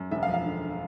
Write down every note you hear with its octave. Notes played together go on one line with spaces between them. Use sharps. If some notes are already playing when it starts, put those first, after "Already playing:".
Already playing: F#2
E1 E5
F5
F3
F5
D3